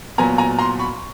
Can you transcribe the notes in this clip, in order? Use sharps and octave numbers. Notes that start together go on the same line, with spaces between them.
A#2 F#3 B3 G#5 A#5
G#5 A#5
A#5 C6
B5 C#6